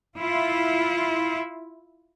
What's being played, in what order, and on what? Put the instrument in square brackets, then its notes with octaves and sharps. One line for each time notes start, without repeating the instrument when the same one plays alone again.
[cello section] E4 F4